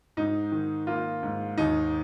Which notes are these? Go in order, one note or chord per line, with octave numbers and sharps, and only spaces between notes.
G#2 D#4
D#3
A#3 F4
G#2
D#2 D#4